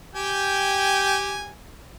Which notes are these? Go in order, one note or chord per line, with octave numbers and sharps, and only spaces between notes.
G4 G5 G#5